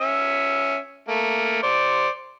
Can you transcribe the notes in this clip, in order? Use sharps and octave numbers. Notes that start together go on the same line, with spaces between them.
C#4 E5
A3 A#3
C5 D5